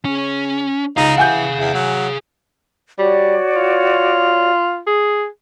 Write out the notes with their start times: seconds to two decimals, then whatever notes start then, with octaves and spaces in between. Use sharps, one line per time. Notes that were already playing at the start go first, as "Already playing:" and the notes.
0.05 C#3 C#4
0.97 C#2 D#4 G#4 F5
1.17 E3 F#5 G#5 G6
1.59 E2
1.74 F#3
2.99 G3 F#4 C#5 D5
3.56 F4
4.87 G#4